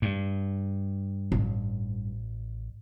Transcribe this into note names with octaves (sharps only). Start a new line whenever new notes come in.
G2
A1